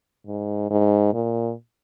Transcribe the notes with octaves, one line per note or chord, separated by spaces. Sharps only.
G#2
G#2
A#2